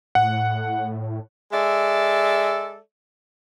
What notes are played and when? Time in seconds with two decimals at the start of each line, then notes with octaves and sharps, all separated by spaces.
0.15 A2 F#5
1.52 G#3 A4 D5 E5